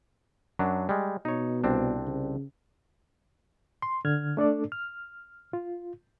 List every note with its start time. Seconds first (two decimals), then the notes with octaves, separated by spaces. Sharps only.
0.59 F#2 F#3 D4
0.89 G3 G#3
1.25 B2 D#4 C#5
1.64 C2 C4 D4
2.07 C#3
3.82 C6
4.05 D3 F6 G#6
4.37 A3 D4 A4 D5
4.72 F6
5.53 F4